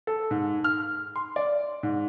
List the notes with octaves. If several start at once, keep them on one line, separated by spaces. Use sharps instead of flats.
A4
G#2
F6
C6
D5
G#2